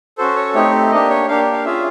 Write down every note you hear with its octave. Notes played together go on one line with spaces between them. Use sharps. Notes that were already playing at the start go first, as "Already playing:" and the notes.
C#4 F#4 A4 C5
C#5
A3 C4 D#4 G4 C#5
A#3 D4 G4 D#5
C#5
A#3 D4 G4 F5
F5
C#4 F4 G#4 E5